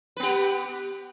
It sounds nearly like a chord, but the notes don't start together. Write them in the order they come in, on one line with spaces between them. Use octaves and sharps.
B4 B3 G4